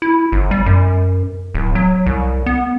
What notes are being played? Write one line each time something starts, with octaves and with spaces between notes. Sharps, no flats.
E4
G1
G3
F#2
D1
F#3
C2
B3